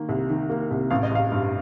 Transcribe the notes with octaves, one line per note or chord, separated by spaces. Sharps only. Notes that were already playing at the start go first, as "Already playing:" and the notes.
Already playing: D#3 A#3
C2
D#3
A#3
C2
A1 F5
D#5
A1 F5
G2